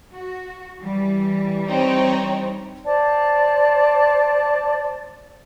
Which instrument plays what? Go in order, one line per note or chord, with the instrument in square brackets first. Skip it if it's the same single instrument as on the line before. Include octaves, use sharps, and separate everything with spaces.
[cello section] F#4
E3 G3
[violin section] C4 D#4 C#5
[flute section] C5 D5 A5